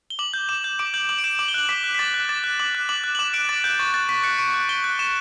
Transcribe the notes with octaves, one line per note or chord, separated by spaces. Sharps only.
G7
D6 F#7
G6
D6 E7
G6
D6 D7
G6 F#7
D6 F#7
D7
G6 E7
D6 F#7
G7
F#6 F#7
D6 B6
F#6
B6
D6 A6
F#6
D6 A6
F#6
D6 F#7
F#6
D6 F#7
F#6
F#7
D6 E7
F#6 D7
D6 A6
F#6 G6
C#6 A6
F#6 A6
C#6 B6
F#6 C#7
C#6 D7
F#6
C#6 G7
F#6
C#6 E7